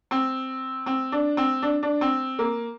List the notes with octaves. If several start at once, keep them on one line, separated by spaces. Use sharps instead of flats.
C4
C4
D4
C4
D4
D4
C4
A#3